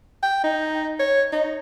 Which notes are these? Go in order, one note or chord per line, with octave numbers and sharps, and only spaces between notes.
G5
D#4
C#5
D#4